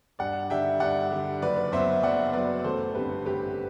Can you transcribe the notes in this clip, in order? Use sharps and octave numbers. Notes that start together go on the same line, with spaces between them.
G2 D5 F#5
D3 G3 E5 G5
G2 D5 F#5
D3 G3
F#1 B4 D5
F#2 F#3 B3 C5 E5
F#1 D5 F#5
F#2 F#3 B3 B4 D5
A1 A4 C5
G2 D3 A3 C4 G4 B4
A1 G4 B4